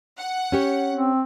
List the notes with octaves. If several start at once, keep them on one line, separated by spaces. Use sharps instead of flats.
F#5
C#4 G4 C#5
C4